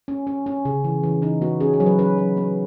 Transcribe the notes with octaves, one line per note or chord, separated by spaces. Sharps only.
C#4
C#4
C#4
C#3
E3
E3
E3 D#4
B3 F#4
C#4 G#4
G#4
F#3
B4
C#4 B4
F#3
B3